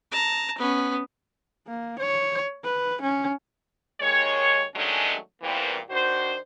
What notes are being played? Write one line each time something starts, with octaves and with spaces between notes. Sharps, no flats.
A5 A#5
B3 C#4
A#3
C#5
B4
C#4
D#2 D#3 G#3 C#5
D#3 F#3 G#3 A3 C#4 D4
E2 A#2 E3 G3 A#3 C4
D#3 D4 F#4 C5